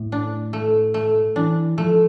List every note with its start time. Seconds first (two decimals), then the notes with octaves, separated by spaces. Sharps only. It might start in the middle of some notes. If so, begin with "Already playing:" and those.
Already playing: A2
0.12 D4
0.53 A3
0.94 A3
1.36 E3 D4
1.78 F3 A3